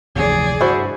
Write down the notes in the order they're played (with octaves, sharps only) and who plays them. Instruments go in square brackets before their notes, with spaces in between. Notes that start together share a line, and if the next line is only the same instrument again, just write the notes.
[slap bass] F1 D2 E3 [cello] G#4 D5
[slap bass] G2 [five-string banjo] E4 F#4 C5